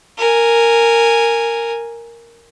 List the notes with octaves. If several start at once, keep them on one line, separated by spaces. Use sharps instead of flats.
A#4 G#5